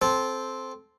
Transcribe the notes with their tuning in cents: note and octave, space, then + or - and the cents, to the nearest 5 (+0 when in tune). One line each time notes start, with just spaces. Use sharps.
C4 +0 A4 -15